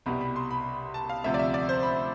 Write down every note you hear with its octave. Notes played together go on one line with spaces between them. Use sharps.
C2 B2 G3 B5
B5
C6
B5
A5
F5
D2 C3 F3 E5
D5
E5
D5
C5
B5